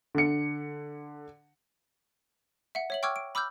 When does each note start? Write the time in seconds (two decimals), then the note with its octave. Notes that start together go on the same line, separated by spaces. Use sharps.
0.15 D3 C#7
2.75 E5 F#5
2.90 C#5 E5 F#7
3.03 G5 C#6 D6 E6 F6 G#6
3.16 D7
3.35 B5 D6 E6 F6 G6